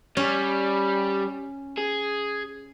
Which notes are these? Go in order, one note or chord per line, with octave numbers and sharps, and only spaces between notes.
G3 C#4
G#4